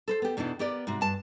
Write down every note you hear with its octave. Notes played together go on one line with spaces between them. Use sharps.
A4 B4 C5
B3 G4
E2 B2 E3 D4 D#4
B3 G4 A#4 D5
G#2 C3 F#4
G2 A5